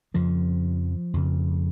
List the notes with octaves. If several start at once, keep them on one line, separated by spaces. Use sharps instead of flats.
F2 C#3 F3
F2 C#3